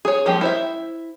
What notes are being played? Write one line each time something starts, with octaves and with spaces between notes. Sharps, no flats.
G#4 C#5
F3 G#3 A#3 C#4 G4
E4 C5 E5